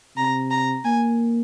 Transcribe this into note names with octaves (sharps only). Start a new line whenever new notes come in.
C3 A#5
A#5
A#3 G#5